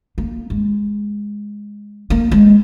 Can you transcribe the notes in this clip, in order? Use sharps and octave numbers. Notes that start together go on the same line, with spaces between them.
A#3
G#3
A#3
G#3